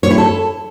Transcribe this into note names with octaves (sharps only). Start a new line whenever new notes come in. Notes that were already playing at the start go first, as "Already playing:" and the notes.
C#5
E4
A4